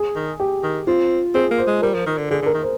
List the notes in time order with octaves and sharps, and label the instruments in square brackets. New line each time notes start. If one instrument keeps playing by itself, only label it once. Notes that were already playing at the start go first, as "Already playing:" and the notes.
Already playing: [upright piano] G#4
[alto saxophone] D#3
[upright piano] G4
[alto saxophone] D#3
[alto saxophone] C4 [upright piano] F4
[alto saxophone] C4 [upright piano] G#4
[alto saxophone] A#3
[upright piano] C5
[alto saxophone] G#3
[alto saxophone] G3 [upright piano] A#4
[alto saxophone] F3
D#3
D3
[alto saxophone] D3 [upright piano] G#4
[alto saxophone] D3
[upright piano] A#4
[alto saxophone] D#3
[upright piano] C5